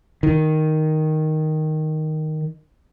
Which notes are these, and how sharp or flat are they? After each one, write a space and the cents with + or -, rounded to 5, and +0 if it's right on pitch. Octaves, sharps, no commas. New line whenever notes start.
D#3 +0